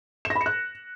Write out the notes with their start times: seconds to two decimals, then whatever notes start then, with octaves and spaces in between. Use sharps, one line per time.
0.25 E7
0.30 A#6
0.35 B5
0.41 C#7
0.46 F#6